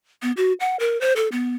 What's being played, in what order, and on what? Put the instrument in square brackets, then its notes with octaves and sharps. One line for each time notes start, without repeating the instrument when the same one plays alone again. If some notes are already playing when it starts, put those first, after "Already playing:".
[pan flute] B3
F#4
F#5
A#4
C5
A4
B3